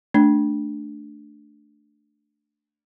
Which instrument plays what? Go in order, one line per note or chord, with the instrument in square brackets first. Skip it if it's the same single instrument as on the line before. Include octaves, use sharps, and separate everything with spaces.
[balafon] A3 D4